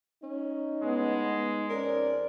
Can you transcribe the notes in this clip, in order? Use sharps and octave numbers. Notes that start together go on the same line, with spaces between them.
C#4 D#4
A2 G#3 B3
F2 C#4 A#4 C5 D5